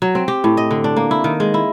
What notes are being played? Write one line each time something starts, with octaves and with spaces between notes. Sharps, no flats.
F#3
C4
G4
A2
D#5
D3
D4
A#3
E4
D#3
G#3
E4